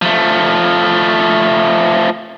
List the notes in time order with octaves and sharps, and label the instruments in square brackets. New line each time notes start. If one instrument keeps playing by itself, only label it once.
[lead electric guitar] F3 A3